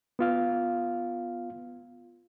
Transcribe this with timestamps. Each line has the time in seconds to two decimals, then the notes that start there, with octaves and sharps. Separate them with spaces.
0.19 B3 F4 F5